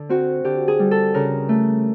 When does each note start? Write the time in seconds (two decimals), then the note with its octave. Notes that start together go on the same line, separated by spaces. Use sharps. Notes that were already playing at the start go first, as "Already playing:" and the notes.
Already playing: D3
0.09 C4 F#4
0.44 D3 G4
0.68 G#4
0.79 G3
0.91 A4
1.14 C#3 A#4
1.49 A3